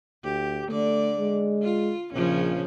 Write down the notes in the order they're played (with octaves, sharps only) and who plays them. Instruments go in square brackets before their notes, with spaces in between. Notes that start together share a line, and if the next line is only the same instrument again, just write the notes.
[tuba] D2 [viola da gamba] G4
[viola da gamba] D3 D5 [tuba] A3
[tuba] G#3
[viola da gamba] F4
[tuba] A#1 [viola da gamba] C#3 F3 C#4